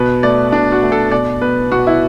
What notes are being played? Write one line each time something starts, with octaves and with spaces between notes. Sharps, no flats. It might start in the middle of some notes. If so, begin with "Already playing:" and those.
Already playing: B2 B4
A3 D5
B2 D4
F#4
A3
A4
B2 D5
B3 B4
B2 F#4
E4